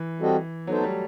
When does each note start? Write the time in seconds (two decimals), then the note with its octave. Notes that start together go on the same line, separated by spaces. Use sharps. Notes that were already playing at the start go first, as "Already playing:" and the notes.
Already playing: E3
0.20 G3 C4 F#4 A4 D#5
0.67 F#3 B3 D#4 A4 C5
0.79 A3
0.83 G3